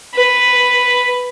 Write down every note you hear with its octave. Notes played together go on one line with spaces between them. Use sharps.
B4